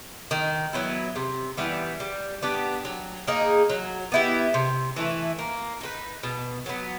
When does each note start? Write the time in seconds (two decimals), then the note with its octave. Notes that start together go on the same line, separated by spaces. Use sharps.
0.31 D#3
0.73 F#3 B3 E4
1.16 C3
1.57 E3 G3 B3
2.00 G3
2.42 B3 D4 G4
2.85 F#3
3.27 A#3 D#4 G#4
3.70 F#3
4.12 B3 E4 G4
4.54 C3
4.96 E3 A3
5.39 A#3
5.81 D#4 F#4 B4
6.23 B2
6.66 F#3 B3